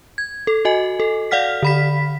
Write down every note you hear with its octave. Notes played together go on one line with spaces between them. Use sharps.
G#6
A4
F#4 D#5 G#5
A4
D5 F5 F#5 F6 B6
D3 B5 B6